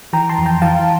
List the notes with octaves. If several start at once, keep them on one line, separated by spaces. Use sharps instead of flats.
E3 G5 A#5
A5 C6
F2
G5 A#5
E3 F5 A5